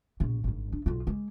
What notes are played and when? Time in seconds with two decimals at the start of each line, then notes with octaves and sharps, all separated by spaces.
0.20 A#1 B2
0.44 G#1 G2
0.73 D4
0.86 B1 F4
1.07 G#3 A#3